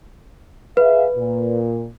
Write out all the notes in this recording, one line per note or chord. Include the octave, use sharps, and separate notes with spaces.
G#4 B4 E5 F5
A#2